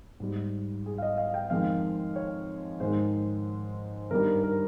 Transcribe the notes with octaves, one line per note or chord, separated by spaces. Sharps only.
G#2 G3
G#4
F5
D#5
F5
G5
F2 D#3 G#3 F5
C#5
G#2 D#3 G#3 C5
G2 D#3 G3 A#4
A#4